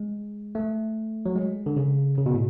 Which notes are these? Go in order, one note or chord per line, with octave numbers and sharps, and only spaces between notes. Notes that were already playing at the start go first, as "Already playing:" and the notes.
Already playing: G#3
A3
F#3
G#3
D3
C#3
C#3
B2
A2